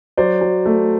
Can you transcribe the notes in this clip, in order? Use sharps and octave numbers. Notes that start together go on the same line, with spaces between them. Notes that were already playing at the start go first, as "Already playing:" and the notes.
F#3 C5 D5
F#3
A3